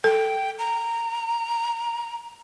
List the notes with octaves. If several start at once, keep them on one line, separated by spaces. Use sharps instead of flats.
A4 G5
A#5